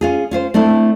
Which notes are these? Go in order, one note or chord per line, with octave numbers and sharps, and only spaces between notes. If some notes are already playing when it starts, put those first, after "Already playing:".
C#4 F4 G#4
C#4 F4 C5
A3 C4 D4 E4